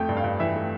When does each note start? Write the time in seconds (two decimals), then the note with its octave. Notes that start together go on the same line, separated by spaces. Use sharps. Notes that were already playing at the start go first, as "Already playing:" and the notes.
Already playing: F2 A3 G5
0.09 G2
0.17 F5
0.24 G2
0.40 E3 E5
0.55 A3